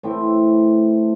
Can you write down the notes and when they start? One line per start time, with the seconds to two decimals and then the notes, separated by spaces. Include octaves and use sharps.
0.03 A2 E3 A3 C4